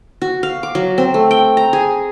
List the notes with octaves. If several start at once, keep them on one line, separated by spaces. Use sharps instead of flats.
F#4
F5
D6
F#3
C4
A3
G5
A#5
G#4